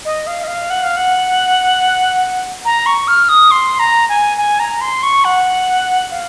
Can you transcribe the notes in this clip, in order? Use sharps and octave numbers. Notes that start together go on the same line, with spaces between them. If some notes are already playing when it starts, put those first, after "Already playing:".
D#5
F5
D#5
F5
F#5
F5
F#5
A#5
C#6
F6
D#6
C6
A#5
G#5
G#5
A#5
C6
C#6
F#5
F5